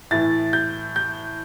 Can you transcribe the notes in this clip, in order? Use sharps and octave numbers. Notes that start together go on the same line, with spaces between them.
A2 E3 A6
G6
G6